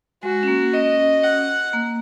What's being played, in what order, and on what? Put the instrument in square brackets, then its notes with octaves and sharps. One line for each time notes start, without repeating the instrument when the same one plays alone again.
[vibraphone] G#3 [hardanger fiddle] F#4
[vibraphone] C#4
A#3
[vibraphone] C#4 [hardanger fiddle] D#5
[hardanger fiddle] F#5
[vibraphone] A#3